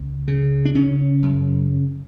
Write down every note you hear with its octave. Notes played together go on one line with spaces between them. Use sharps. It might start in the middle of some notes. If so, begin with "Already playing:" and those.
Already playing: C#2
C#3
D4
C#3 C#4
F#2